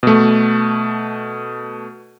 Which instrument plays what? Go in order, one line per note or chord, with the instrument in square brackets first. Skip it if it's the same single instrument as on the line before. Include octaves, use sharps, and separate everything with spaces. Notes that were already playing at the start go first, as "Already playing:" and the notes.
[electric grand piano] B2 A3